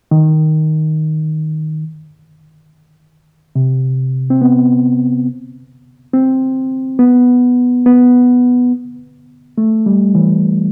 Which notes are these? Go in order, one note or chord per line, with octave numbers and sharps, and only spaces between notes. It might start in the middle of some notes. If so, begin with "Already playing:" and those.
D#3
C3
C4
B3
C4
B3
B3
A3
G3
E3